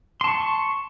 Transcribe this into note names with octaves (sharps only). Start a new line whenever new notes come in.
A5 C6 C#6